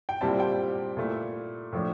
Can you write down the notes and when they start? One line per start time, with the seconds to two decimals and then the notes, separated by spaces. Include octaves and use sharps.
0.09 G5
0.21 A#2 G3 C4 E4 A5
0.40 G5
0.97 A#2 A3 E4
1.73 A2 F3 A3 D4